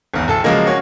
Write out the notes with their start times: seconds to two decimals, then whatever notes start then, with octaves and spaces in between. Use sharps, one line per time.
0.14 G#1 E2
0.28 D1 A4 A5
0.44 C#3 F3 F#3 G#3 A#3
0.67 A#3 C#4 F#4